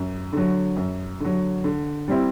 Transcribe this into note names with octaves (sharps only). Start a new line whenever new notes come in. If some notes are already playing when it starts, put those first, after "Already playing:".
Already playing: F#2
D3 F#3
F#2
D3 F#3
D3
G3 C4 E4